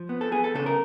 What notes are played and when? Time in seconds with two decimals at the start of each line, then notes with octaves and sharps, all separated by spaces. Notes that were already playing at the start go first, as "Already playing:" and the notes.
Already playing: F3
0.09 B3
0.21 A4
0.31 B3 G#4
0.44 A4
0.55 C#3 A4
0.66 A#4